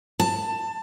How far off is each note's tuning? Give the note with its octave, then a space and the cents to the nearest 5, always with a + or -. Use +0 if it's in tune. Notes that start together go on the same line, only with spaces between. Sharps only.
A5 +15